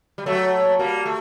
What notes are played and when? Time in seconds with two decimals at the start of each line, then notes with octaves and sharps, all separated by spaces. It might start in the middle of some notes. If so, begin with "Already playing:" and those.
0.18 G3
0.26 F#3 A3
0.79 G3 A#3
1.05 A3